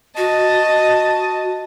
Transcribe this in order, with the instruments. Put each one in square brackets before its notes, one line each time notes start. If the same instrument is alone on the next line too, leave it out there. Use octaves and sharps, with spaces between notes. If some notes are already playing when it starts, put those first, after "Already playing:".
[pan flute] F#4 [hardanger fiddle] D#5 A5